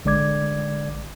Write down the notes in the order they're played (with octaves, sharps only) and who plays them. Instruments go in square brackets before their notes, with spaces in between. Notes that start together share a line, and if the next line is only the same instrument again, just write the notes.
[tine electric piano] A1 D3 G#3 D5 D6 G#6